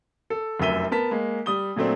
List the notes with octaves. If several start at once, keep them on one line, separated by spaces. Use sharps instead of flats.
A4
F1 F#2 A#4 E5 D#7 G7
B3 A#4 A5 B6
G#3 A#3
G3 D#6 G7
A#2 F#3 A3 C4 D4